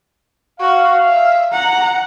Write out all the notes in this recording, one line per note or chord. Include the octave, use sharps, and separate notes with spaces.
F#4 F5
E5
F#5 A#5